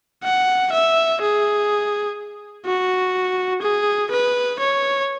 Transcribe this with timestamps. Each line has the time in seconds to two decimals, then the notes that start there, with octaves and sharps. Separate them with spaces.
0.24 F#5
0.72 E5
1.21 G#4
2.66 F#4
3.63 G#4
4.11 B4
4.59 C#5